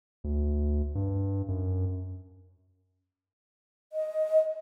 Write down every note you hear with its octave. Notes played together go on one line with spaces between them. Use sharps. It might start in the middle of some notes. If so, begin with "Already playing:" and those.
D2
G2
F#2
D#5